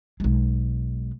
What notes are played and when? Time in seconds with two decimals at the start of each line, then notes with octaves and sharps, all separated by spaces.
0.20 B1 G#3